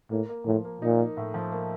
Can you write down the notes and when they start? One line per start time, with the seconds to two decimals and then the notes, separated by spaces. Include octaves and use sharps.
0.11 A2 A#3
0.29 A#3
0.46 A2 F3
0.65 A#3
0.82 A#2 D#4
0.99 A#3
1.17 A2
1.34 F3
1.52 A#3